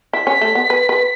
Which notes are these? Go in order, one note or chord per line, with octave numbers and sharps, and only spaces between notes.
E4 B6
C#4
A3
B3
B4
B4